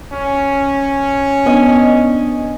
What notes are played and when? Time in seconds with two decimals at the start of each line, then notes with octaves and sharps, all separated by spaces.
0.13 C#4
1.46 B3 D4 D#5 G#5